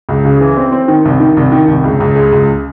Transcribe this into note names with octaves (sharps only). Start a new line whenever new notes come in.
C#2
C#3
E3
C4
C4
D#3
C2
D#3
C2
D#3
C2
C#2
C#2
G#3
C#2